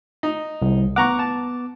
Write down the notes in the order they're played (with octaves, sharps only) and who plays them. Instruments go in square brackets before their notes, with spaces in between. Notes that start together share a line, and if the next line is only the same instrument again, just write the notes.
[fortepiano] D#4
[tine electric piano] C2
[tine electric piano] B3 D6 [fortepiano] F#5 A#5 C#6
[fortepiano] A5